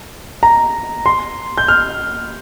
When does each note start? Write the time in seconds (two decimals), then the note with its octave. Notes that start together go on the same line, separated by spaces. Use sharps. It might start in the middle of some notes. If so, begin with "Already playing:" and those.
0.43 A#5
1.06 C6
1.58 G6
1.68 F6